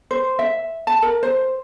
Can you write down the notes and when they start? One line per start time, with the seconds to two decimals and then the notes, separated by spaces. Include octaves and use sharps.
0.11 C5
0.39 E5
0.87 A5
1.02 A#4
1.23 C5